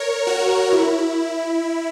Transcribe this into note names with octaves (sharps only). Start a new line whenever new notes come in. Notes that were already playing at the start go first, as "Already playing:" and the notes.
Already playing: A#4 C#5
F#4 A#4
E4